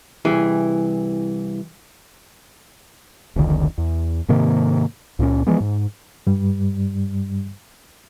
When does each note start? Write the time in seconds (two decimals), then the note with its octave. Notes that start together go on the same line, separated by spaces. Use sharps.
0.25 C2 E3 G#4
3.36 F1 C#2 D3 D#3
3.78 E2
4.29 G#2 C3 D#3 A#3
5.19 C#2 A#2 C4 C#4
5.47 E3 F3 G#3 B3
5.60 G#2
6.27 G2 G3